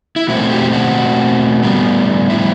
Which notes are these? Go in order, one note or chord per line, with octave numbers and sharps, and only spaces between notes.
E4
B2 A3 C4 F#4
G4
F#4
A2 G3 B3 D4
E4